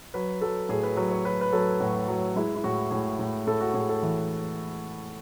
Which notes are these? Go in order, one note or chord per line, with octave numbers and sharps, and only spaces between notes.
F#3 B4
F#3 A4
A2 G#4
B4
F#3 B4
C#5
F#3 B4
B4
F#3 A4
A2 F#4
F#3
G#3 E4
E4
A2 F#4
A2 G#4
A2
A2 A4
F#4
A2 G#4
A4
E3